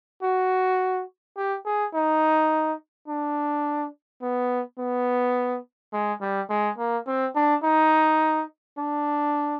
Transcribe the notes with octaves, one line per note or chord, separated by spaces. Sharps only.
F#4
G4
G#4
D#4
D4
B3
B3
G#3
G3
G#3
A#3
C4
D4
D#4
D4